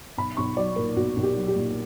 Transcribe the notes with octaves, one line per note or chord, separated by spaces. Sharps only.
B1 B5
B1 C#6
F#3 D5
A#2 A#4
B1 F#4
B1
G4
F#3
G4
A#2